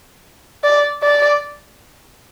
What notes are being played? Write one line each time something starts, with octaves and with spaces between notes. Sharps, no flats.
D5
D5